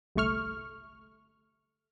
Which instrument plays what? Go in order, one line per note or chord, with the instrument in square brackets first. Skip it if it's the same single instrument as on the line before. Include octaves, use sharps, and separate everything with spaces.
[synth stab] G1 C2 A3 C#6 F6